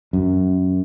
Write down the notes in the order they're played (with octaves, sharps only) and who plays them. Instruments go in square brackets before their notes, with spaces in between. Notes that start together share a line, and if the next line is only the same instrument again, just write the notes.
[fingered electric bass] F#2